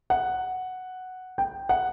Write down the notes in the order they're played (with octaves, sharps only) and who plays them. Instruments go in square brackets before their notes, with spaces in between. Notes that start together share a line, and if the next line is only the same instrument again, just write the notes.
[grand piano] F#5
G5
F#5